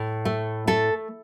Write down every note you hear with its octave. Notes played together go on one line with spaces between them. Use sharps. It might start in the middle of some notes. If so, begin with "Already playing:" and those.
Already playing: A2
A3
A3 A4